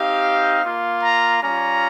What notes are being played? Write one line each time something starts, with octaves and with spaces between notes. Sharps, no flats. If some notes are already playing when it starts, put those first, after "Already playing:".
Already playing: C4 D#4 G4 F5
A#3 F4
A#5
G3 C#4 F4 A#5